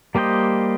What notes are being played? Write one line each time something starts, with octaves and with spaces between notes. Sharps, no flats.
G3 A#3 G4 C5 D#5